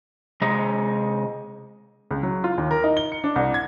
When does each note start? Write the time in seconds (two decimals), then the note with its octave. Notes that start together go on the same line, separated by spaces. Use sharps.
0.41 C3 G#3 G#4 D#5 A#5
2.11 C#2
2.23 F#3
2.44 F4
2.58 D#2
2.71 A#4
2.84 D#4
2.97 G7
3.12 C#7
3.24 D4
3.36 C2
3.54 G#6